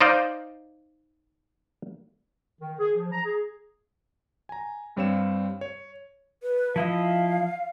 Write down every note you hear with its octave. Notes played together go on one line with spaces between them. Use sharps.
D#4 C5 D5 D#5 F5
D#3
G#4
F3
A#5
G#4
G#5 A#5
G2 G3 C4 C#5 F5 E7
C#5
B4
F3 E4 D#5 F5